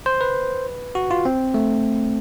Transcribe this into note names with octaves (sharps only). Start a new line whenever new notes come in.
C5
B4
F#4
F4
C4
A3